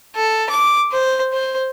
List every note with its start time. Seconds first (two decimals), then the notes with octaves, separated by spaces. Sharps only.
0.15 A4
0.50 D6
0.92 C5
1.33 C5